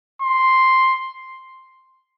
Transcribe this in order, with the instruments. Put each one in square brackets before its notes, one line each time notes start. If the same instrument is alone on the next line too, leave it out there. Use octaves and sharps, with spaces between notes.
[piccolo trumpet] C6